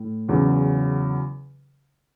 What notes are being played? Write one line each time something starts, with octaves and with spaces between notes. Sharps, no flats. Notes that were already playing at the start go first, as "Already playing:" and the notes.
Already playing: A2
E2 C#3 F#3